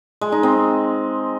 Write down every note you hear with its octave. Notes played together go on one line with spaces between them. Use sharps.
G#3
D#4
C4